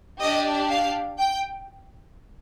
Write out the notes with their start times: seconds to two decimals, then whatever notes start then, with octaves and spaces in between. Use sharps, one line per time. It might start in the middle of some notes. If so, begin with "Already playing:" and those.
0.21 D4 G4 D#5
0.70 F5
1.19 G5